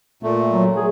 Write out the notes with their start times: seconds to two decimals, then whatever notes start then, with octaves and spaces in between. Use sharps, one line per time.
0.23 A#2 A3
0.50 F#3
0.77 G#4